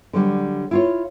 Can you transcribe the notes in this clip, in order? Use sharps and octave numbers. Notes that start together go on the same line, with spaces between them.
D3 F#3 G3
E4 F4 C#5